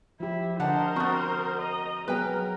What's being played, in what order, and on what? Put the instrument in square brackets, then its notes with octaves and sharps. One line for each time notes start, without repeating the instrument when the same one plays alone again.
[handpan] F3 G4 [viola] E4
[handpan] D3 D#5 [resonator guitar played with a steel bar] D4 F#5 A5 [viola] A#4 C5
[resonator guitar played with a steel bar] B3 F#4 [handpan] C4
[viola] D#5 A#5
[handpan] F#3 B3 G#4 [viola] A#4 [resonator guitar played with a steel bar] B4 G5